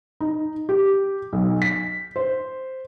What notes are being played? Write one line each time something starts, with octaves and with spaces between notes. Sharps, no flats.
D#4
G4
B1
B6
C5